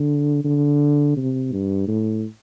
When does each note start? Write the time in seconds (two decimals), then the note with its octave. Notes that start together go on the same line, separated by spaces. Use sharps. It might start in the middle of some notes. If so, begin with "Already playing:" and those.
Already playing: D3
0.44 D3
1.17 C3
1.52 G2
1.87 A2